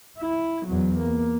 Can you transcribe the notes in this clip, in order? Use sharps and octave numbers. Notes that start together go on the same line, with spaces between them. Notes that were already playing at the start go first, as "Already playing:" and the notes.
E4
E2 F#3
A#3